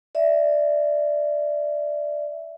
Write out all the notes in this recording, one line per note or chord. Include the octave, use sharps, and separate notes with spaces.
D5 E5